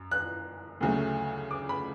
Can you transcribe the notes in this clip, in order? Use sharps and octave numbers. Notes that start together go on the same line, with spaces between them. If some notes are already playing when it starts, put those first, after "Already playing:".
Already playing: F#2
F#6
D2 C#3 F#3 A3
D6
B5